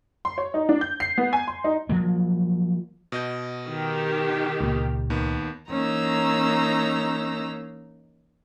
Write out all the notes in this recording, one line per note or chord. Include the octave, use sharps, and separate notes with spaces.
C6
C#5
D#4
D4
G6
C7
B3
G#5
C6
D#4
F3 F#3 A#3
B2 D#5 G6
D#3 G4
C#2 A#2
D#2 D#3 B3
E3 A#3 C#4 D#4 A#5 E6